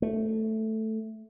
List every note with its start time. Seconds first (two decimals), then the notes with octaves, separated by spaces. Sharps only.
0.02 A3